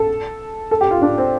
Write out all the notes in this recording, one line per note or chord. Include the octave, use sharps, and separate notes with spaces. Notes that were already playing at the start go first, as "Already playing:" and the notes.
Already playing: A4
A4
G4
F4
D4
C4